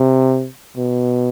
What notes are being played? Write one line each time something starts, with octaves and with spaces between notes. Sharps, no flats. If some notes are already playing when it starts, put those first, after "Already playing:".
Already playing: C3
B2